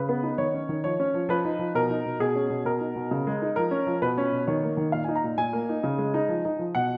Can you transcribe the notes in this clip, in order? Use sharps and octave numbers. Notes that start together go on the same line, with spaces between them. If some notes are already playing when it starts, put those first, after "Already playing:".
Already playing: C#3 B4
B3
D#4
D#3 C#5
C#4
D#3
F3 C#5
C#4
F3
F3 B4
D#4
F3
B2 A#4
D#4
B2
B2 G#4
C#4
B2
B2 A#4
D#4
B2
C#3
G#3
D#4
F3 A#4
C#4
F3
B2 B4
C#4
B2
D#3 C#5
A#3
D#3
A#2 F5
D#4 G#5
A#5
A#2
A#2 G#5
A#3
D#4
C#3
G#3
D#4
F3
D#4
F3
B2 F#5